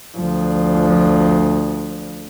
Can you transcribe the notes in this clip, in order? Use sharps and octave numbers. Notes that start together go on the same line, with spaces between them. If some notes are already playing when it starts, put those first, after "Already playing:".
D2 F3